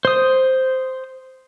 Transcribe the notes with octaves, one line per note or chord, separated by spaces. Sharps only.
C5 D#6